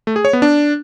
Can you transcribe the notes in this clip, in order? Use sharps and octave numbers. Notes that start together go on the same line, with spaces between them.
A3
G#4
C#5
B3
D4